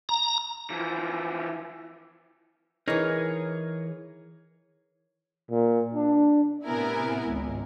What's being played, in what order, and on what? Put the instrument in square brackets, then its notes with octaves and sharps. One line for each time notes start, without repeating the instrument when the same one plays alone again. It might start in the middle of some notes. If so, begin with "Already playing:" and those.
[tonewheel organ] A#5
[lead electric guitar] E3 F3
[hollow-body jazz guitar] E3 D#4 [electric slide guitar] G#4 A#4 C#5
[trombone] A#2
D4
[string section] A2 C3 B3 E4 A#4 G#5
G#1 C#2